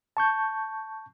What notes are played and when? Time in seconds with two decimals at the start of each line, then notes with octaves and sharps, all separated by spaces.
0.17 A5 C#6 G6